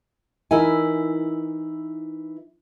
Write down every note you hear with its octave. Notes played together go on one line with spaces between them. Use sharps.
E3 D#4 E4 A#4 E5 G#5